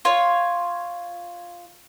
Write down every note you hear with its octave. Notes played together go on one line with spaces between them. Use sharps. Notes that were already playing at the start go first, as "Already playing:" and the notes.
F4 C#5